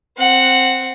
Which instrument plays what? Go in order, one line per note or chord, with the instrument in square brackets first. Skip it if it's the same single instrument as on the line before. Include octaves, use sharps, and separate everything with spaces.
[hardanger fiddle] C4 F#5